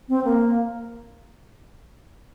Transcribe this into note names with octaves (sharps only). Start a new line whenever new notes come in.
C4
A#3